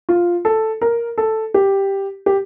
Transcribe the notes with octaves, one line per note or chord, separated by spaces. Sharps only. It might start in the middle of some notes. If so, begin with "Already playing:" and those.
F4
A4
A#4
A4
G4
G4